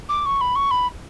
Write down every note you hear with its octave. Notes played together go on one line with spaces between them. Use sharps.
D6
C#6
B5
C#6
B5